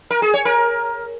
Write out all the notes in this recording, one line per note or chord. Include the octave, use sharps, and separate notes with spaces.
A#4
G#4
C#5
A#4